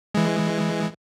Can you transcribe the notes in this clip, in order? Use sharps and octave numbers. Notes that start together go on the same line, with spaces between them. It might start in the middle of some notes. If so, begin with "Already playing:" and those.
E3 G#3